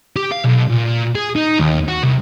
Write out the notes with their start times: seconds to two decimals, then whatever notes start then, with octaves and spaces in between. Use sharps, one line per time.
0.16 G4
0.32 F5
0.45 B1
0.69 A#2
1.15 G#4
1.36 D#4
1.59 D#2
1.88 F#4
2.04 C2